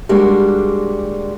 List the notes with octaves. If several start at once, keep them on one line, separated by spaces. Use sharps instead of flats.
G3 G#3 A#3 D4 F#4